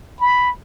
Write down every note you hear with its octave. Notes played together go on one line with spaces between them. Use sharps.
B5